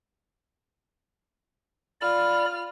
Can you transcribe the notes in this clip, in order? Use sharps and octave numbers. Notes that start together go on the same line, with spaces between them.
F4 D5 B5 F6